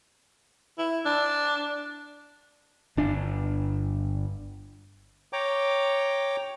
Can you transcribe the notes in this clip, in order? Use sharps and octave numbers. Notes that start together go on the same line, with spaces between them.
E4
D4
G1 D4
C#5 G5 A#5 D6